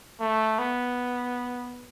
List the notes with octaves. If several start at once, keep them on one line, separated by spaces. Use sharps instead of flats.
A3
B3